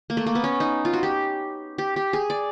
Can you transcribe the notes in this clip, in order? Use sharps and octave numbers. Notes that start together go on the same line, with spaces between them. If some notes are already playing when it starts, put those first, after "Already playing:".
A#3
A3
A#3
B3
C#4
D#4
F4
F#4
G4
G4
G4
G#4
D5